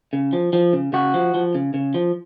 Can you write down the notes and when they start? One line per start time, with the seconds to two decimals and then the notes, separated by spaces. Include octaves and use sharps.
0.13 C#3
0.33 F3
0.53 F3
0.73 C#3
0.93 C#3 F#4
1.14 F3
1.34 F3
1.55 C#3
1.74 C#3
1.94 F3